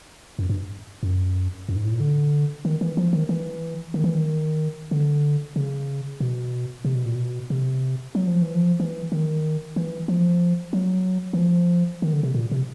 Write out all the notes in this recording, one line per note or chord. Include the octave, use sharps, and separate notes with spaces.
F#2
G2
F#2
F#2
G#2
A2
A#2
D3
D#3
E3
F3
D#3
E3
D#3
E3
D#3
D3
C#3
B2
C3
B2
A#2
B2
C3
F#3
F3
E3
F3
E3
D#3
E3
F3
F#3
E3
F3
D#3
D3
C3
A#2
C3